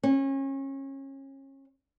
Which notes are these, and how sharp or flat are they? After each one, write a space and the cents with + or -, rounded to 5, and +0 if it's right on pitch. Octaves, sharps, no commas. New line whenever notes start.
C#4 -30